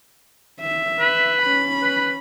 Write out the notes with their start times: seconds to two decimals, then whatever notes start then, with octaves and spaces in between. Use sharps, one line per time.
0.61 E5
1.00 B4
1.42 C#4 B5
1.82 B4